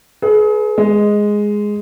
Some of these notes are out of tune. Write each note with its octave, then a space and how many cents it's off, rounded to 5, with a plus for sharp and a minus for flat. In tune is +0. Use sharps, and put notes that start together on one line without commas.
G#4 +35 B4 -10
G#3 +0 D#5 +0